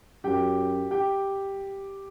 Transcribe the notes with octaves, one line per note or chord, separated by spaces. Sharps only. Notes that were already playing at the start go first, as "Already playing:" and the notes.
F#2 G4 G5
G4 G5